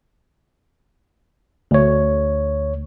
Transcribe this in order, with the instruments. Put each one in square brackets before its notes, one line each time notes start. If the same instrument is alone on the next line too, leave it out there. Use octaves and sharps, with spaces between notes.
[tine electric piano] D2 C#5